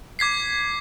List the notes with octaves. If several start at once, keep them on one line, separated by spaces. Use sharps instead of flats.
D6 G#6 B6 C7